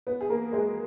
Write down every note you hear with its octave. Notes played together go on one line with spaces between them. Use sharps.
B3 B4
G#4
A#3 A#4
G#3 G#4